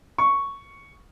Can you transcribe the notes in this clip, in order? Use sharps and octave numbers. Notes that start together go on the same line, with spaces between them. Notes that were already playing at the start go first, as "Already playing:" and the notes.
C#6